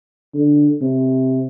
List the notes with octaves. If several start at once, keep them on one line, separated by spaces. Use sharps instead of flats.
D3
C3